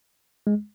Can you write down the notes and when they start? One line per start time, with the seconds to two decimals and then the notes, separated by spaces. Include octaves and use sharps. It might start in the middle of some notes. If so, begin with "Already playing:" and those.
0.47 G#3